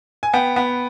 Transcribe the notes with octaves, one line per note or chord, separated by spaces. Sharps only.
G#5
B3 G5
B3